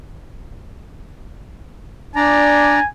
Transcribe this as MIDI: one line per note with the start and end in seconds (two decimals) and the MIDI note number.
2.16 2.79 62
2.16 2.79 74
2.16 2.88 80
2.16 2.79 82